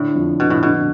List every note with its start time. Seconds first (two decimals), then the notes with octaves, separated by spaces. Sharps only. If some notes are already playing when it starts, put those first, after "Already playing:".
Already playing: A2 D3
0.15 F2
0.39 B2 D3
0.50 A2
0.63 B2 D3